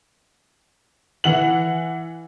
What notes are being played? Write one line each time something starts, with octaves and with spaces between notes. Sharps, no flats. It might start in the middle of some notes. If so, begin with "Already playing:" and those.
E3 F#5 F#7